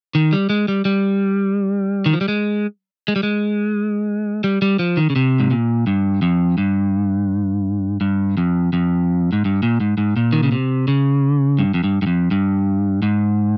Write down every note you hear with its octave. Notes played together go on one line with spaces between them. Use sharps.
D#3
G3
G#3
G3
G3
D#3
F3
G3
G#3
G#3
G3
G#3
G3
G3
F3
D#3
C#3
C3
G#2
A#2
G2
F2
G2
G2
F2
F2
G#2
G2
A#2
G#2
G#2
A#2
D#3
C#3
C3
C#3
G2
F2
G2
G2
F2
G2
G#2